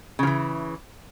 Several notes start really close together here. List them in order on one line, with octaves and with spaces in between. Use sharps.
C#3 F3 E3